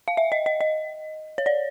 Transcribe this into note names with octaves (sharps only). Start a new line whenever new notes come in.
F5
E5
D#5
D#5
D#5
C#5
D5